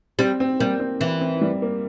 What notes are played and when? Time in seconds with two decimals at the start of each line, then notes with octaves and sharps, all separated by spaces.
0.19 G3 C4
0.40 C4
0.60 G3 A#3
0.80 C4
1.00 E3 C4
1.21 C4
1.41 G3
1.62 A#3